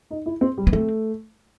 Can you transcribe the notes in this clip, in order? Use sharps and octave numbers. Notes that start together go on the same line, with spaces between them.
D#4
E4
C4
G3
B3
A3 C4